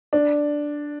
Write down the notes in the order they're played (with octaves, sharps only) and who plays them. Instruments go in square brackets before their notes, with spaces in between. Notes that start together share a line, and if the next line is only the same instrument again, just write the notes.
[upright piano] D4